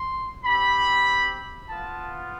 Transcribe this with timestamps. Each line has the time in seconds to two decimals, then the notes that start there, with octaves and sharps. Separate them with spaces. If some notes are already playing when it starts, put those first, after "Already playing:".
Already playing: C6
0.44 C4 G4 B5
1.67 B3 F4 A5